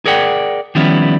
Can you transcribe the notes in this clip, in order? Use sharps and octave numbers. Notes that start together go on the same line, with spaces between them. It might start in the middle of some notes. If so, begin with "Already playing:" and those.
G#4 A#4 D5 F#5 G5
D#3 F3 G3 B3 C#4 E4